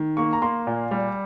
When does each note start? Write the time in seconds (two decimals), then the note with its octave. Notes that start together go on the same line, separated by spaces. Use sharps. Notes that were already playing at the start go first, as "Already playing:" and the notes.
Already playing: D#3
0.17 A#3 C#6
0.33 A#5
0.42 A#3 C6
0.67 A#2
0.91 G3